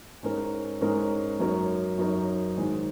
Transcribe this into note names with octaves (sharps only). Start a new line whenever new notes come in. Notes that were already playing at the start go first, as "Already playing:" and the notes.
G#2 G#3 C#4 A#4
G#2 G#3 C#4 A#4
F#2 F#3 D#4 A#4 C#5
F#2 F#3 D#4 A#4 C#5
G#2 D#3 G#3